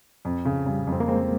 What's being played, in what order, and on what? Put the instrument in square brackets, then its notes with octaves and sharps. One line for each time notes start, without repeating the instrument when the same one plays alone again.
[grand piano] F2
C#3
[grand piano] C#3 [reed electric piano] G3
[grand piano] F2
[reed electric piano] C4
A#3
[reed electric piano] G#3 [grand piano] C4